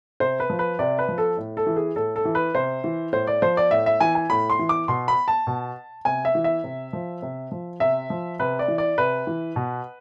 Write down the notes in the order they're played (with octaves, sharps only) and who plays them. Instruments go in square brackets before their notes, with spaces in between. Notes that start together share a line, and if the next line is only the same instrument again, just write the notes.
[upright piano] C3 C5
B4
F3
B4
C3 D5
B4
F3
A4
A2
A4
E3
G#4
A2 A4
A4
E3
B4
C3 C5
E3
A2 C5
D5
F3 C5
D5
A2 E5
E5
E3 G#5
G#5
A2 B5
C6
E3
D6
B2 C6
B5
A5
B2
C3 G#5
E5
E3
E5
C3
F3
C3
F3
C3 E5
F3
C3 B4
D5
E3
D5
C3 B4
E3
B2